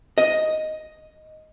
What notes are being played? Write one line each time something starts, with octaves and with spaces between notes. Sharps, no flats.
D#5